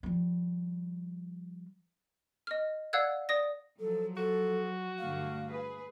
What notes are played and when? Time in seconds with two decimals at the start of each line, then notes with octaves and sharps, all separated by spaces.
0.03 F3 G3
2.47 D#5 F6
2.93 D5 F5 F#5 E6 F#6 G#6
3.29 D5 D#6 A#6
3.80 F3 F#3 A4
4.17 F#4 A4
4.99 G2 D3 A3 F5
5.49 G#4 B4